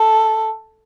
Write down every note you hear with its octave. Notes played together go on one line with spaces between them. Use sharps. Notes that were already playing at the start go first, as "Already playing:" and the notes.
Already playing: A4